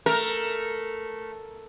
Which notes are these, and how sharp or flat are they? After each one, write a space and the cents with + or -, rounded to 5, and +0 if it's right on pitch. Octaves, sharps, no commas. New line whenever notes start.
A3 +0 A#4 +0